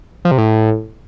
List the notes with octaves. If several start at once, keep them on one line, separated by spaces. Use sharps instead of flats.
F3
C3
A2